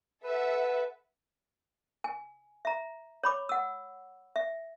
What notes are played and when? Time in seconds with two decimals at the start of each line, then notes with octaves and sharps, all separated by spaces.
0.24 A4 B4 E5 F#5
2.04 G#5
2.65 E5 A#5
3.23 C#5 B5 D6
3.49 F#5 E6
4.36 E5